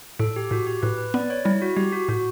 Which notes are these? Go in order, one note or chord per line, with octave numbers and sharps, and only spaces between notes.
A2 A4
G4
A2 F#4
G4
A2 B4
B4
B3 D5
C#5
G3 E4
F#4
G3 G4
F#4
A2 F#4